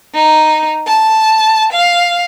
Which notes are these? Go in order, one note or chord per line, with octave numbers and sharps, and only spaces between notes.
D#4
A5
F5